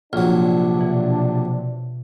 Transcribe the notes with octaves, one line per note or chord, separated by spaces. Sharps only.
A#1 C3 F#3 D4 F4
B2 E3